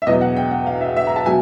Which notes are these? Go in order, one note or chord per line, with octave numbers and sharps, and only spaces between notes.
E5
E2 B2 F#3 D#5
F#5
G5
F#5
F5
E5
E5
A#5
A5
B2 F#3 G#5